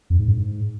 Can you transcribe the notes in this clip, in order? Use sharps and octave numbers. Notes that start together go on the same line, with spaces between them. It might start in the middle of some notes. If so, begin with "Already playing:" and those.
F2
G#2
G2
G#2